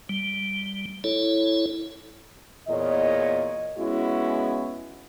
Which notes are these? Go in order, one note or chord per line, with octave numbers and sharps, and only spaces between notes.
G3
E4 A4 C#5
E2 A#2 C#5 D#5
G#3 B3 C#4 E4 F#4